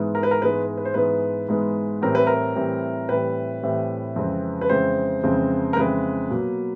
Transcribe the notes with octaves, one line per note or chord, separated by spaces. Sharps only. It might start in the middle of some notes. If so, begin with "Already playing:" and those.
Already playing: G#2 E3 G#3 B3
A#4
B4
A#4
G#2 E3 G#3 B3 B4
B4
C5
G#2 E3 G#3 B3 B4
G#2 E3 G#3 B3
A2 E3 G3 C4 A#4
B4
A#4
A2 E3 G3 C4
A2 E3 G3 C4 B4
A2 E3 G3 C4
F2 C#3 E3 G#3 C4
B4
F2 C#3 E3 G#3 C4 C5
F2 C#3 E3 G#3 C4
A#4
F2 C#3 E3 G#3 C4 B4
B2 F#3 A#3